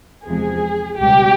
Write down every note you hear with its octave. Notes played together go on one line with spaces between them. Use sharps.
E2 C3 F3 G#3 G#4
C#2 B2 G3 G4